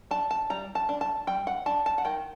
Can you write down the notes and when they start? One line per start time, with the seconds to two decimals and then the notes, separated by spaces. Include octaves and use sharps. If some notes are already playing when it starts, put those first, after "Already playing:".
0.11 D4 A5
0.31 A5
0.50 G3 A#5
0.75 A5
0.89 D4
1.01 A5
1.27 G3 G5
1.47 F#5
1.66 D4 A5
1.86 A5
1.98 F#5
2.05 D#3 G5